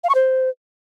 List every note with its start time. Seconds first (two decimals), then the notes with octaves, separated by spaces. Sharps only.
0.04 F5
0.09 C#6
0.15 C5